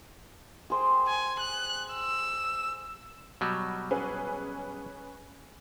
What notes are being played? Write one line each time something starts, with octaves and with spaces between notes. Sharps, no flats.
G#4 C5 G5
G#5
F#6
E6
B2 F#3 G3
C#4 G#4 B4